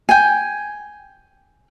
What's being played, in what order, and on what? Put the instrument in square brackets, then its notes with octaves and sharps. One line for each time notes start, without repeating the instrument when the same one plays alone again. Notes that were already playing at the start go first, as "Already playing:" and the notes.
[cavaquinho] G5 G#5